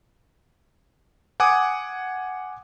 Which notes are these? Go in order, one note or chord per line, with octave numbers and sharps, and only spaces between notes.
F#5 G#5 D6 D#6